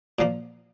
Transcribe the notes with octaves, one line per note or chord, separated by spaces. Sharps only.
A#2 F3 A#3